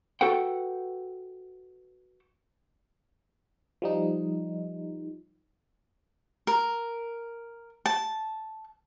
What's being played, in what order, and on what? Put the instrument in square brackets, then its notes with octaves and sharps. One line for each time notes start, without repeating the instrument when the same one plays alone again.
[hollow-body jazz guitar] F#4 A4 B4 F#5 G5
[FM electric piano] F3 G3 D#4
[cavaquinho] A#4
A5